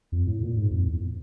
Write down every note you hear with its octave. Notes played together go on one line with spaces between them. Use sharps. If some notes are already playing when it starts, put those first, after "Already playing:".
F2
A2
A#2
G#2
F2
E2